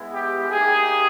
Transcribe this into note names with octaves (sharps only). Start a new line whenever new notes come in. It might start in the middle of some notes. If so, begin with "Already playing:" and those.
Already playing: G#3 B3 E4
G4
A#3 D#4 G4 G#4